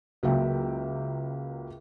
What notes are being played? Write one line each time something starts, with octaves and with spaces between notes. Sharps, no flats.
C#2 F#3 A#3 E5 G5